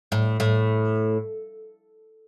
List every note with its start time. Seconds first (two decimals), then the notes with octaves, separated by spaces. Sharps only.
0.12 A2
0.40 A2